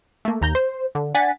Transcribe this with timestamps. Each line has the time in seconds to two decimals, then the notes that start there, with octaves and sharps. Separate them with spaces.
0.25 A3 A#3
0.41 D#2 A#5 G6
0.55 C5
0.95 D3
1.14 D4 F#5 G#5 A6 B6